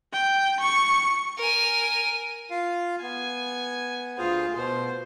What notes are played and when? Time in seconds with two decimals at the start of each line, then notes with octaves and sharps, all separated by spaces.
0.13 G5
0.60 C#6 C#7
1.38 A#4 G#5
2.51 F4 F5
3.02 B3 G#5
4.18 D2 F4 G#4 C5
4.56 B2 C5